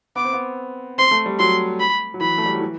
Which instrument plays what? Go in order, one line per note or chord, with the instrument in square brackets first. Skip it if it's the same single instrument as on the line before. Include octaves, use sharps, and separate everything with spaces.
[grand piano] B3 [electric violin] D6
[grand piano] C4
B3
[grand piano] C4 [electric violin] C6
[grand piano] A3
G3
[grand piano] F#3 [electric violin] C6
[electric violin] B5
[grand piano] F#3
[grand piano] E3 [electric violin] B5
[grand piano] A3
G3
F#3
E3